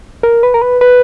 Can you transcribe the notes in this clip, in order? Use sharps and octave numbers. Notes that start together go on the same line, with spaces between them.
A#4
B4
A#4
B4
B4